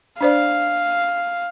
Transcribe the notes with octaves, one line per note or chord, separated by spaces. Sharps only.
D4 C5 D5 F5